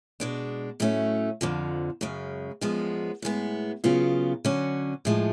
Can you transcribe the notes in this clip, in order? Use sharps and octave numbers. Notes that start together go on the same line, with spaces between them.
B2 G#3 D4
A2 F#3 A3 C#4
F2 D3 F3
F#2 C#3 G#3
F#2 F3 G#3 B3
A2 G#3 B3
C#3 F#3 B3 F4
D3 F#3 C#4
A2 F3 G#3